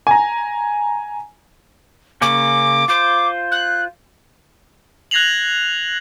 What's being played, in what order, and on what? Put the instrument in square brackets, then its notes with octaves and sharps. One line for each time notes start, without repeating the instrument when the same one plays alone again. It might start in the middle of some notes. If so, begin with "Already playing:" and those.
[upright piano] G#5 A#5
[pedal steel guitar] C#3 A#3 C#4 [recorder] D6
[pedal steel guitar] F4 C5 [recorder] D6
[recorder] F#6
[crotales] F#6 G#6 A#6 C7 F7 F#7